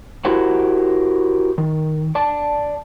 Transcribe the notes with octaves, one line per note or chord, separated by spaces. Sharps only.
E4 F#4 G4 A#4 C5 F#5
D#3
D5 A5